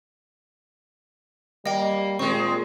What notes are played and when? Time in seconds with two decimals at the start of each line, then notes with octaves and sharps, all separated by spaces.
1.66 G3 A#3 D#5 G5
2.19 A#2 G#3 C4 C#6